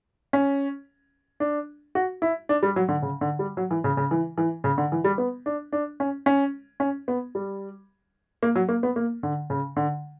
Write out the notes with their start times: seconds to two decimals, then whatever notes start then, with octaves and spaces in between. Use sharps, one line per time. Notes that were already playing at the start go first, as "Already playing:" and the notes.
0.33 C#4
1.40 D4
1.95 F#4
2.22 E4
2.49 D4
2.63 G3
2.76 F#3
2.89 D3
3.02 C#3
3.21 D3
3.39 G3
3.57 F#3
3.71 E3
3.84 C#3
3.97 C#3
4.11 E3
4.38 E3
4.64 C#3
4.78 D3
4.92 E3
5.04 G3
5.18 B3
5.46 D4
5.72 D4
6.00 C#4
6.26 C#4
6.80 C#4
7.08 B3
7.35 G3
8.43 A#3
8.56 F#3
8.69 A#3
8.83 B3
8.96 A#3
9.23 D3
9.50 C#3
9.76 D3